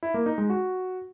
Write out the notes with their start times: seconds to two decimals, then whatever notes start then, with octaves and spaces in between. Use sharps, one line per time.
0.03 E4
0.14 A#3
0.26 D#4
0.38 G#3
0.50 F#4